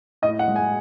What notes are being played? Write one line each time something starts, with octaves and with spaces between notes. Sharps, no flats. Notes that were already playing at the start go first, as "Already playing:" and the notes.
A2 D#5
F#5
G#3
G#5